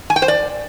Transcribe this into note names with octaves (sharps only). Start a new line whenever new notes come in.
G#5
G5
C5
D5